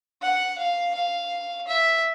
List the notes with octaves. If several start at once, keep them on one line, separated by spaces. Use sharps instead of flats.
F#5
F5
F5
E5